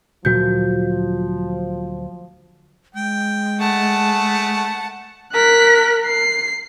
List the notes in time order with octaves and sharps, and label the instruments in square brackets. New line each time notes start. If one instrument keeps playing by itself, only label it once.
[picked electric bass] D2 A#2 F#3 [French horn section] F3 [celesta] F#4 G6
[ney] G#3 [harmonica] G5
[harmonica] A3 G#4 [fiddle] F#5 A5
[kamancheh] A#4 [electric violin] F#6 B6
[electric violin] C7